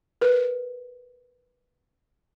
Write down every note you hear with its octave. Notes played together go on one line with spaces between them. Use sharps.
A#4 B4